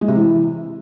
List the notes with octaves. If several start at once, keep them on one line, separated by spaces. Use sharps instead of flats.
G#3
C3
E3